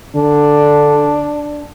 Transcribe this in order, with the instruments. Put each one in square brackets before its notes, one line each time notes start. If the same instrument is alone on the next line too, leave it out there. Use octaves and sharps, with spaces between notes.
[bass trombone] D3 [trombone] D4